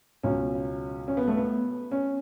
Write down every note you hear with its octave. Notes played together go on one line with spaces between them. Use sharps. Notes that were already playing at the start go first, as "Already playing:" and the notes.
C#2 B2 F#3 C#4
C#4
B3
A3
B3
C#4